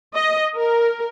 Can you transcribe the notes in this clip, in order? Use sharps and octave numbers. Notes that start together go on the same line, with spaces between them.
D#5
A#4